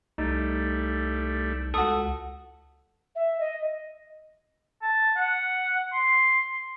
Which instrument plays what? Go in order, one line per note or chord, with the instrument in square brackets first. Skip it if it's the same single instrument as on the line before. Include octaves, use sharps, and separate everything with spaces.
[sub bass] C2 [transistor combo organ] G3 A3 [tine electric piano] D#4
[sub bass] C#2 [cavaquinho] F#4 D#6 [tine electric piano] A4
[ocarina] E5
D#5
[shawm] A5
F#5
C6